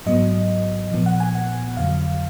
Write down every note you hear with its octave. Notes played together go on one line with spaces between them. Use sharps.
G#2 F#3 B3 D#5
A#2 F3 B3
F#5
G#5
F#5
F2 D3 F#3 F5